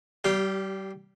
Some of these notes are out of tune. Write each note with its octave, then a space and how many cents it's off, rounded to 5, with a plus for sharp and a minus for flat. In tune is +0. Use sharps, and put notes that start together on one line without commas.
G3 -30 G4 +0 F5 -10